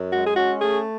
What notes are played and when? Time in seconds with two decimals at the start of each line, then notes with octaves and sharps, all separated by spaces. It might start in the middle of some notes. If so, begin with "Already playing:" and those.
Already playing: F#2
0.12 G#3 F#4
0.27 G#4
0.37 C#4 F#4
0.61 A3 G#4